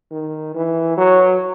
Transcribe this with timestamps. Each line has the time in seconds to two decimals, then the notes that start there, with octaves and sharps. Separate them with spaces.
0.11 D#3
0.55 E3
0.97 F#3